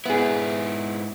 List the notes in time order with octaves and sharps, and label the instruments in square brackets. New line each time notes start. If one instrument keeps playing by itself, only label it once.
[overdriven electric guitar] G#2 E4 [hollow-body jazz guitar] B3 G#4